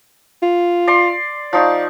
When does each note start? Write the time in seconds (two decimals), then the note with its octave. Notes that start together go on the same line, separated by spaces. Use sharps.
0.43 F4
0.87 D5 C6
1.53 F3 D#4 D5 C#6